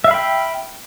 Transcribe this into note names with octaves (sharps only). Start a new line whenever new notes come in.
E5 F5 G5 B5